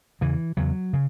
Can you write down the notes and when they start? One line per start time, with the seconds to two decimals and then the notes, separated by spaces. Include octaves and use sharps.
0.21 E2 C#3 E3
0.57 E2 C#3 F#3
0.93 C#3